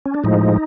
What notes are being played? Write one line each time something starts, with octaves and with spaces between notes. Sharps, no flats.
C#4
D4
A2 F3 G#3 D#4